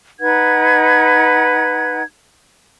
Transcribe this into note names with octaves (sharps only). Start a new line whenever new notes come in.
D#4 B4 F#5 G#6